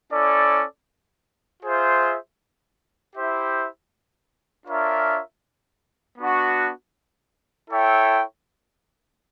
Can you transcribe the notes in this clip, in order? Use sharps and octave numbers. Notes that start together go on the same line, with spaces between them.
C#4 E4 A4 D5
F4 G#4 C5 E5
E4 G4 C5 E5
D4 F4 A#4 C#5 E5
B3 D4 F#4
E4 A4 C#5 E5 G5